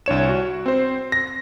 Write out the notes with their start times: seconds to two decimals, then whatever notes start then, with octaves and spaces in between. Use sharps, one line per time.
0.06 C2 D4 C#5 E7
0.29 F#4
0.66 C4 C5
1.12 A#6